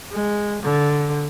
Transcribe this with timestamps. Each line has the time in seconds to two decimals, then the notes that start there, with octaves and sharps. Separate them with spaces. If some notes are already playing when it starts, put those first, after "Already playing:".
0.11 G#3
0.62 D3